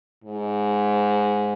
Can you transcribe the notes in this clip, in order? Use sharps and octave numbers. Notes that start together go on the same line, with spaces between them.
G#2